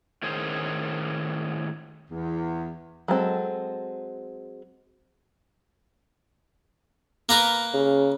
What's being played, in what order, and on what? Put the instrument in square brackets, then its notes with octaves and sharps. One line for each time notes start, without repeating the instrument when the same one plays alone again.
[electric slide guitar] A2 D#3 C#4 G#4 C5
[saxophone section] E2
[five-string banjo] F#3 G#3 C4 A4
[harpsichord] A#3 A#4 B4
[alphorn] C#3